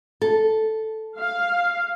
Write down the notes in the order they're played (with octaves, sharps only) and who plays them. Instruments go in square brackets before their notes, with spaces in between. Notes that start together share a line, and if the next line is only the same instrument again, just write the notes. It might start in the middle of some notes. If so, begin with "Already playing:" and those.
[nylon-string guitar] A4
[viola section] F5